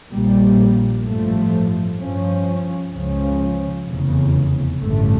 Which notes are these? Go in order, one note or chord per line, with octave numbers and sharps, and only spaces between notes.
A#1 A#2 G3 A#3
A1 G2 F3 A3
G2 F3 C#4
C#2 C#3 F3 C#4
F1 E2 C#3
A1 G2 D3 A3